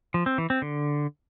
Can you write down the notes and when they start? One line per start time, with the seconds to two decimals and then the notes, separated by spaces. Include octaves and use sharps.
0.14 F3
0.26 C4
0.38 E3
0.50 C4
0.62 D3